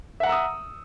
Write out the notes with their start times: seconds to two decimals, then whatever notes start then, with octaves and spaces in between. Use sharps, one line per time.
0.20 E5
0.23 F#5
0.26 A#5
0.29 E6
0.32 D#6